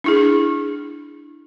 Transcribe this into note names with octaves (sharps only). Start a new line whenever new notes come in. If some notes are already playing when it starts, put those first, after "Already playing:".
D4 E4 G#4